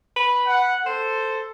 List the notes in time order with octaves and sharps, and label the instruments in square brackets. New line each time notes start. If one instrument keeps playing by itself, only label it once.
[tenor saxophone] B4
[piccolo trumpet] F#5
[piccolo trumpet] A4 [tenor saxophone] C5